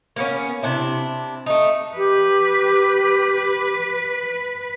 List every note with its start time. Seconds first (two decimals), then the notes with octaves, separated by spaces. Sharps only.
0.16 A#3 B3 C#4
0.63 C3 D4 E4
1.46 A3 D#4
1.96 G4 B4